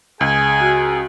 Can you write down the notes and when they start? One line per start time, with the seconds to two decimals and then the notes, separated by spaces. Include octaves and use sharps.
0.21 C#2 G#4 G#5
0.60 F#4